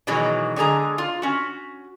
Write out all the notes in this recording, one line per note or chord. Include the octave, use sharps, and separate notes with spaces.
B2 D#3 E3 F#3 G#3
D3 G#3 G#4 A#5
F4
C#4 F#4